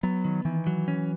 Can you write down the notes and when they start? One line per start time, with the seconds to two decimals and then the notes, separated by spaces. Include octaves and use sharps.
0.03 F#3 B3
0.25 D#3
0.45 D#3 E3
0.67 F#3
0.88 C#4